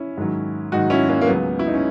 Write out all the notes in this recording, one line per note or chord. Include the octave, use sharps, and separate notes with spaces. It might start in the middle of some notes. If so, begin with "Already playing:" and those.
Already playing: C#4 E4
G#2 D#3 F#3
G#2 D#3 F#3 D#4 F#4
C#4 E4
A#3 C#4
A#3
C#2 C#3 F#3 B3
E4
D#4
C#4